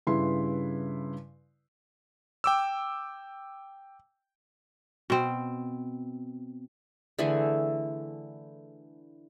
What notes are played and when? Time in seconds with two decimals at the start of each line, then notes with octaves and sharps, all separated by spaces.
0.07 G2 C#3 E4 B4 C6
2.44 G5 D6 E6
5.10 B2 C4
7.19 D3 E3 A3 G#4